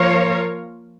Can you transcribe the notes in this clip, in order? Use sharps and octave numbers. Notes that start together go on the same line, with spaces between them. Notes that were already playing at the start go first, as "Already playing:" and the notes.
Already playing: F3 A#3 F4 A#4 C#5